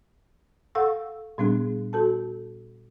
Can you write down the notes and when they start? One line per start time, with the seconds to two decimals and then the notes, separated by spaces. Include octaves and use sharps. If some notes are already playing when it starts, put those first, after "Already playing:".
0.75 A4 F5 F#5 C#6 E6
1.38 A#2 G3 B3 D4 G#4
1.93 F#4 A4 A5